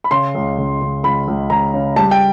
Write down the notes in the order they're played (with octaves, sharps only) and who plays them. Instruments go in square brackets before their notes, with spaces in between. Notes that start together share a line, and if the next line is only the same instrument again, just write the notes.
[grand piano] B5
C#3 C6
C#2
C#2
C#2
C#2 B5
C#2
C#2 A#5
C#3
G3 A5
G5